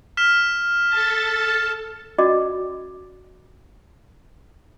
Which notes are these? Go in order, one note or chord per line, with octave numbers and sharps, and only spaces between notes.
F6 B6 E7
A4 A5
C#4 F#4 D5 D#5 D6